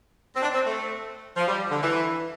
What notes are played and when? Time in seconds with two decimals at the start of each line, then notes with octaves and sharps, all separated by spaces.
0.36 C4
0.43 D4
0.54 C4
0.66 A3
1.37 F3
1.48 G3
1.71 D3
1.83 E3